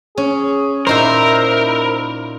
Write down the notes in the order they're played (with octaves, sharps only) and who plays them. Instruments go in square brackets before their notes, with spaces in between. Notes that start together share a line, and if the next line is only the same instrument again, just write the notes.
[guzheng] C#4 [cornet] G#4
[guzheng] A#2 D#4 A#5 [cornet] E4 [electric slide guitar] A#4 [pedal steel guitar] C5 E5